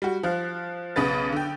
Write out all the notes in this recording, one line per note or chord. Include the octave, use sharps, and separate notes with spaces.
G3 F#4
F3 F5 F#6
B1 C#3 B3 B4 A6
D3 G5